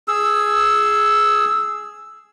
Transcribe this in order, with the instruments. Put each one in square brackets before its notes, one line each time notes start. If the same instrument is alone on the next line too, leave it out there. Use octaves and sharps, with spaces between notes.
[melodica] G#4 E6